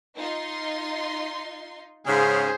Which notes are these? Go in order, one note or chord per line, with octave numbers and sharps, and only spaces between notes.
D#4 F4 C6
G#2 C#3 G#4 C5